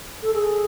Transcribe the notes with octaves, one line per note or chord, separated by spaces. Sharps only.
A4
G#4